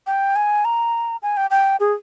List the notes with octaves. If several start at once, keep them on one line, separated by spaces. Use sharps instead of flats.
G5
G#5
A#5
G#5
G5
G5
G#4